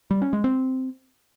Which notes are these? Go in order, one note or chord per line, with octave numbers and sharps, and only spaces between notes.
G3
C#4
G#3
C4